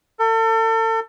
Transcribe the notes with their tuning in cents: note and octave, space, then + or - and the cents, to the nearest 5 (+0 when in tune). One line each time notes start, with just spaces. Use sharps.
A4 +35